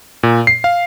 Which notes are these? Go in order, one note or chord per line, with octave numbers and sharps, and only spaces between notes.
A#2
C7
F5